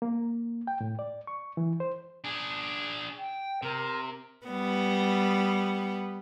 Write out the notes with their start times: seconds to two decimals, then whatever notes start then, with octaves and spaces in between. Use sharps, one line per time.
0.02 A#3
0.67 G5
0.81 A2
0.99 D5
1.27 C#6
1.57 E3
1.80 C5
2.24 D4 G#4
3.17 G5
3.63 C3 A#4
4.46 G3 B3